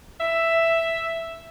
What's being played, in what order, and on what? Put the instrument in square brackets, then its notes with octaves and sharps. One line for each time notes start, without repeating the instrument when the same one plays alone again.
[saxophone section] E5